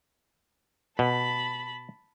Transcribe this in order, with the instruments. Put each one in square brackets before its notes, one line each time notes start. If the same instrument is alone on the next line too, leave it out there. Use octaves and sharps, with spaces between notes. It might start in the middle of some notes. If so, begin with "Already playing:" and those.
[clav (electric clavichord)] B2 [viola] A5 B5